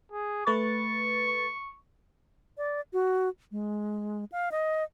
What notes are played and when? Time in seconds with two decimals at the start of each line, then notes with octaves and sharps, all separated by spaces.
0.12 G#4
0.47 A3 B4 C#6 A6
2.58 D5
2.93 F#4
3.52 G#3
4.32 F5
4.52 D#5